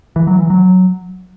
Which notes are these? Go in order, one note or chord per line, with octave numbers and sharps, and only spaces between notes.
E3
F#3
E3
F#3